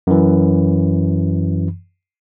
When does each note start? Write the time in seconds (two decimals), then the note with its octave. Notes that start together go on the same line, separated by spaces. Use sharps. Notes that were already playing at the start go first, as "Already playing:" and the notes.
0.07 F#2 E3